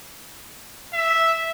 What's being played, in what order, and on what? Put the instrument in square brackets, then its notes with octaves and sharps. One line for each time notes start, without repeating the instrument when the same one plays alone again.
[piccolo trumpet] E5